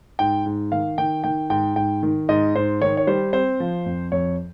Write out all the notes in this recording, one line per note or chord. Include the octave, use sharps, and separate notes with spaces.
G#2 G5
G#2
D#3 F5
D#3 G5
D#3 G5
G#2 G5
G#2 G5
D#3
G#2 D#5
G#2 C5
D#3 C#5
C#5
G3 C5
C4 C5
F3
F2
F2 C#5